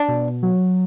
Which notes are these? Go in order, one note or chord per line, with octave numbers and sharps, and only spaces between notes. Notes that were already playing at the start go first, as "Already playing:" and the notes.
Already playing: D4
B2
F#3